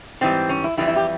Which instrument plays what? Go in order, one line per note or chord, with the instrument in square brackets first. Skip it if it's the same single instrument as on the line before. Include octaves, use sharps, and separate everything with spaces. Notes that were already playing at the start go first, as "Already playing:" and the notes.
[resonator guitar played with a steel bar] G#2 E3 G3 C4
C#4
E4
F2 E3 G3 E4
E4
G4